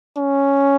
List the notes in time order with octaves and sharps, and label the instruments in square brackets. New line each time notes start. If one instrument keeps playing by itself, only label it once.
[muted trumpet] C#4